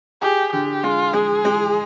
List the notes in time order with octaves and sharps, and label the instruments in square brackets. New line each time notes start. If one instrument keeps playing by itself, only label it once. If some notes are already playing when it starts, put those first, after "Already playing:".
[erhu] G4 [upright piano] G#4
[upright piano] D3 [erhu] G4
[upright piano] G#3 [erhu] F4
[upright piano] G#3 [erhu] G#4
[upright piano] G#3